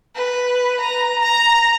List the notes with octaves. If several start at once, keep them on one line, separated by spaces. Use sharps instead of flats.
B4
A#5
A#5